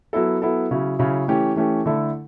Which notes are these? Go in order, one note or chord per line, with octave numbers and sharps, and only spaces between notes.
F#3 B3 E4 A4
F#3 B3 E4 A4
C#3 F#3 C#4 E4
C#3 F#3 C#4 E4
E3 A3 C#4 G4
E3 A3 C#4 G4
D3 A3 E4 A4